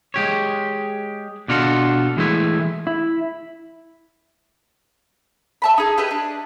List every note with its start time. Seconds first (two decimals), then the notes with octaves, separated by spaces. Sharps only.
0.14 G#3 G4 C#5
1.48 B2 D4 F4 F#4 A4
2.17 E3 G#3 A3 E4
2.87 E4
5.62 E5 A5 B5
5.78 D#4 G#4
5.98 E4 G4 B4 D#5
6.11 D4